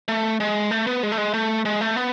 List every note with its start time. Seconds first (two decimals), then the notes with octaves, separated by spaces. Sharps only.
0.08 A3
0.40 G#3
0.71 A3
0.87 B3
1.03 G#3
1.12 A3
1.18 G#3
1.34 A3
1.65 G#3
1.81 A3
1.96 B3